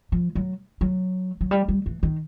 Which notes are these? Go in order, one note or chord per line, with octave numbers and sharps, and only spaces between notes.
F3
F#3
F#3
F#3
G3
G3
E3
D#3